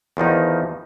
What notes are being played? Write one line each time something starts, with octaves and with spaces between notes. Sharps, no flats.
E2 D#3 F3 D#4